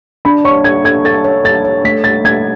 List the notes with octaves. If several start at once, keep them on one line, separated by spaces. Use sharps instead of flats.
D4 B5
C#5 C#6
A4 G#6
A4 G#6
A4 A6
C#5
A4 A6
C#5
A3 B6
A3 A6
A3 G#6